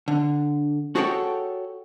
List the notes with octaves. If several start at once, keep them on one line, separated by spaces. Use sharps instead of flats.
D3
F#4 G#4 A4 C#5 F#5 G5